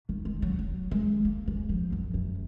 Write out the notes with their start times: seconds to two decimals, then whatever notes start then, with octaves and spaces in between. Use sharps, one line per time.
0.09 D#3
0.25 G#3
0.42 F#3
0.59 F#3
0.91 G#3
1.25 A#3
1.48 G#3
1.69 F3
1.92 F#2
2.14 F#2